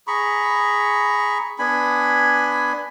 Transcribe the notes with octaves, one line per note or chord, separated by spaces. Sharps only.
G#4 A#5 B5 C#6
B3 D4 G#5 B5